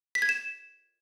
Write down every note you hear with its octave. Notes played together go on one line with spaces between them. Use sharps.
B6
G#6
E7